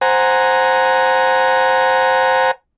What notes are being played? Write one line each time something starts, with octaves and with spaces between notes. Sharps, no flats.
C5 F#5 G#5 A#5